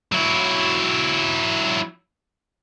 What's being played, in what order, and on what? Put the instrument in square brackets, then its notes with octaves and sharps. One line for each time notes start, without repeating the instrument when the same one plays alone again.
[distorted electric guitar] F#3 E4